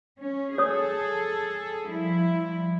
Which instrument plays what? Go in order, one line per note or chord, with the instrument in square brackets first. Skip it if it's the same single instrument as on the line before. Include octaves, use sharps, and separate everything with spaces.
[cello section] C#4
[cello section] G#4 A4 [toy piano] C#5 D#6
[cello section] F3 G3 E4